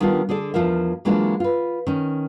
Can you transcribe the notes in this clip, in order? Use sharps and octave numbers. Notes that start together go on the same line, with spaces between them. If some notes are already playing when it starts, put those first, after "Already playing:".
D#3 G3 B3 D4 F4
D3 G#4 A4 D5
E2 E3 F3 F4 A#4 E5
E3 F#3 G#3 A#3 D4 F4
F4 B4
D#3 C#4